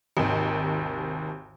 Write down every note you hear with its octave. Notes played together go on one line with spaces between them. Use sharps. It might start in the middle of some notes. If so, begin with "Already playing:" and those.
G#1 D#2 C3 D#3